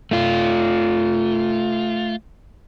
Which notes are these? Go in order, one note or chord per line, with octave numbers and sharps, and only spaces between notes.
A3 F4